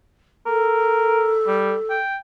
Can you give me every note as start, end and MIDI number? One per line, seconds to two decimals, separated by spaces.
0.46 1.95 69
0.46 1.34 70
1.47 1.74 55
1.90 2.16 79